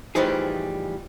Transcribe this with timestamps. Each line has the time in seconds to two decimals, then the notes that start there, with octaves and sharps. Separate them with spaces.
0.15 A2 E3 F3 G3 D#4 G#4